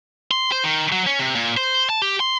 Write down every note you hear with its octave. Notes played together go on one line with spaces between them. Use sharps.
C6
C5
D#3
F#3
C#4
C3
A#2
C5
A5
G4
C6